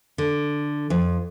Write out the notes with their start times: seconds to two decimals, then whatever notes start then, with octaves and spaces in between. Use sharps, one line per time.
0.18 D3
0.90 F2